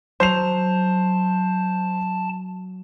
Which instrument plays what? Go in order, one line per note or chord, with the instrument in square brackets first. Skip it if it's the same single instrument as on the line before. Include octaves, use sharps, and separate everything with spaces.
[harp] F#3 [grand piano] C5 C7 F7 [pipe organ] A5